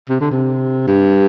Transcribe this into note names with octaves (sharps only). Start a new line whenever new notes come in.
C3
D3
C3
G2